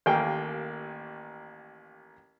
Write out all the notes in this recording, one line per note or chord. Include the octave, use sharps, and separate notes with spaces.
A1 D#2 A#3 G5 G#5